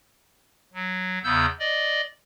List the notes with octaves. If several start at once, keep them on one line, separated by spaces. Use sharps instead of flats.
F#3
E2 C#3 B3 E6 G6
D5 D#5